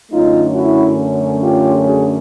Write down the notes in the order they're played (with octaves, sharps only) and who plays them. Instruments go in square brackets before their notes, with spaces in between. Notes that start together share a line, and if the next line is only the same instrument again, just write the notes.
[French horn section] F#2 D3 F#3 A3 C#4 D#4 F4
E4 F#4
F4 G4
F#4 G#4